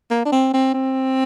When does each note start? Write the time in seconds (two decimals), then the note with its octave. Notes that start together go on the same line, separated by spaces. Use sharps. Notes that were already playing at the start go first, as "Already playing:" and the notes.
0.11 A#3
0.25 D4
0.32 C4
0.54 C4
0.74 C4